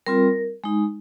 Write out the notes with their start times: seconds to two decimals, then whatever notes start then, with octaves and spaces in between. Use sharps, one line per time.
0.06 G3 C4 F4 A#4
0.64 G#3 D#4